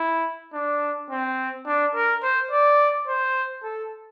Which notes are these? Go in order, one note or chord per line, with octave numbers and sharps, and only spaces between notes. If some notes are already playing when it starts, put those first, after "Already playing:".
Already playing: E4
D4
C4
D4
A#4
C5
D5
C5
A4